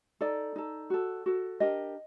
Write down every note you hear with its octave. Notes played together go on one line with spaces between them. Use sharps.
D#4 A4 D5
D#4 A4
F#4 A4
F#4 A4
D4 G4 A#4 D#5